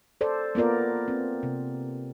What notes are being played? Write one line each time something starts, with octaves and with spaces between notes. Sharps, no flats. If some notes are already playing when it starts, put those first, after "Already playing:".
A4 C5 D5
A#3 B3 F4 A#4 D5
C4
C3